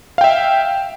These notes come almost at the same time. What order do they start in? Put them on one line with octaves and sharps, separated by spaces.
F5 G5 E5